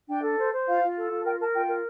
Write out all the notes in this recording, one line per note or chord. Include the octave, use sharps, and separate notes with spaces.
D4 G5
A4
C5
C5
F4 F5
F4
A4
F4
A#4 G5
A#4 A5
F4 G5
A#4